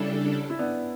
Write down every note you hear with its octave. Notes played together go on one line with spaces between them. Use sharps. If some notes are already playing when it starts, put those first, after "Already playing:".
Already playing: C#3 G3 C#4 D4 E4 A4
E4
B3 D4